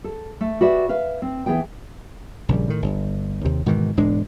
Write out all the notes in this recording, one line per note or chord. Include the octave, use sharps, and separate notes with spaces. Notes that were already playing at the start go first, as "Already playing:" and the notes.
A4
A3
F#4 G4 B4 D5 E5
B4 E5 F5
C4
E3 B3 G#4 G5
A#1 C#3 G3
A2 D#3
G1
D#2 C3
G#2 B2 D#3 E3
E1 G#2 G#3 D4